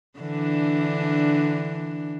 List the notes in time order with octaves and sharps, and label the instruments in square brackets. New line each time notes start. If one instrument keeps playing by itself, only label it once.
[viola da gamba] D3 E3 D4